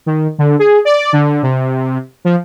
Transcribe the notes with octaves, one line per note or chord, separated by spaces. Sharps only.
D#3
D3
G#4
D5
D3
C3
F3